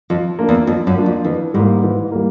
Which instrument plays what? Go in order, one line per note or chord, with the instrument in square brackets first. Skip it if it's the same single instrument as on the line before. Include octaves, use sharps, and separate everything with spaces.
[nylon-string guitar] F2 [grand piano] F3
[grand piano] A#3 D4 F4
[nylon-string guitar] E2
[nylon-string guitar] F2 [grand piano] F3
[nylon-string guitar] F#2
[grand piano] A#3 D4 F4
[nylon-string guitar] F2
[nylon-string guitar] F2 [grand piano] E3
[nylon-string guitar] G#2 [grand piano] G3 A#3
[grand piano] E3
G3 A#3